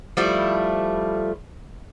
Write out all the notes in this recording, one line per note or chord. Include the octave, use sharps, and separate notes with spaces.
F3 G3 A3 E4